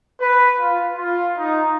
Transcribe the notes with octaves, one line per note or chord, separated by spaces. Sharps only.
B4
F4
F4
D#4